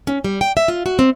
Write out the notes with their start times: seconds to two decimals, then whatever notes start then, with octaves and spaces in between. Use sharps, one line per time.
0.07 C#4
0.24 G3
0.41 G5
0.57 E5
0.68 F4
0.86 F#4
0.99 C4